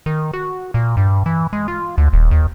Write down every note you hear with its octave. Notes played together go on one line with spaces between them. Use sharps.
D#3
F#4
A#2
G2
E3
G#3
F4
D2
D#1
D#2